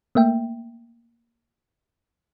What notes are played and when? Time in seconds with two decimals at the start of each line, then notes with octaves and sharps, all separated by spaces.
0.15 A3 A#3 E5 G5